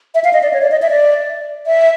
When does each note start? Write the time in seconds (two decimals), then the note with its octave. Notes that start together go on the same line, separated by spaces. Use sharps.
0.15 E5
0.24 F5
0.33 D#5
0.43 D5
0.53 C#5
0.62 D5
0.71 D#5
0.82 E5
0.91 D5
1.67 E5